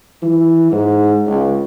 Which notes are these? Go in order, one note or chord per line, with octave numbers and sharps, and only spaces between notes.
E3
G#2
C#2